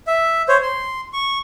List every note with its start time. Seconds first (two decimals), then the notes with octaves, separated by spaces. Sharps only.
0.07 E5
0.48 C5 C#5
0.63 C6
1.13 C#6